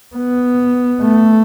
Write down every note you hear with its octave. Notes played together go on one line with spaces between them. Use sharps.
B3
A3